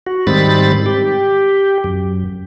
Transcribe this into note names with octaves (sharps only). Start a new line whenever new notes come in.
F#4
G#2 D#3 G3 C4 B5 A6
G4
F#2